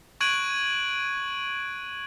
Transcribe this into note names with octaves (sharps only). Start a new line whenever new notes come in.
C#6 F#6 G#6 D7 D#7 F#7